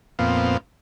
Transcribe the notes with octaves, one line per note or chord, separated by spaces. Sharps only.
F2 A#2 B3 C4 F5